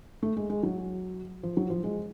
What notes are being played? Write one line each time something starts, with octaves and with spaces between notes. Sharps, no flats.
A3
G#3
G#3
F#3
F3
F#3
F3
G#3